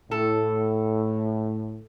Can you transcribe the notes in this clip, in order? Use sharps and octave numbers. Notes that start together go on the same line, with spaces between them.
A2 A4